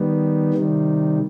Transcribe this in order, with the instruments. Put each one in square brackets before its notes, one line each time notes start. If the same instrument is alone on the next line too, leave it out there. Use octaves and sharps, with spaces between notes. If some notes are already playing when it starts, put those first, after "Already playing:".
Already playing: [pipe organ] D#3 G3 B3
C3 D#3 G3